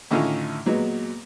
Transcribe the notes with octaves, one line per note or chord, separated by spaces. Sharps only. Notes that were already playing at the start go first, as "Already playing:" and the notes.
A2 D3 D#3 A3 C#4 F4
A#2 F#3 G#3 B3